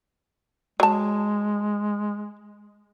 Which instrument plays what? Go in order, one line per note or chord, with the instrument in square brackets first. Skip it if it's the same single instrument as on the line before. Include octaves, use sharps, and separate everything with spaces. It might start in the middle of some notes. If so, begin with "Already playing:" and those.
[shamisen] F#3 A5 [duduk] G#3